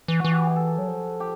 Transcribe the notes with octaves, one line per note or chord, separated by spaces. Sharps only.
E3
E3 F#4
G4
G#4
A4
F#3
F3
G4